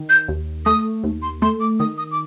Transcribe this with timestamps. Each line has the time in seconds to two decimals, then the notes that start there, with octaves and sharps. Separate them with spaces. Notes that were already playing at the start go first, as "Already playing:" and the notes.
Already playing: D#3
0.09 G6
0.28 D#2
0.66 A3 D#6
1.04 D#2
1.22 C6
1.42 A3 C6
1.60 D6
1.80 D#3 D#6
1.98 D#6
2.11 D6